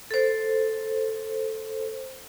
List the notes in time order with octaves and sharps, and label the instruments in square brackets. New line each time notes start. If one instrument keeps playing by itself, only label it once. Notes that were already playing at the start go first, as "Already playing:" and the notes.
[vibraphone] A4 C5